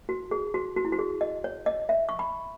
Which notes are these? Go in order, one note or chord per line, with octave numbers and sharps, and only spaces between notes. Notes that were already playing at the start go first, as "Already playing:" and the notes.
F#4
G#4
F#4
F#4
E4
F#4
G#4
D#5
C#5
D#5
E5
C#6
B5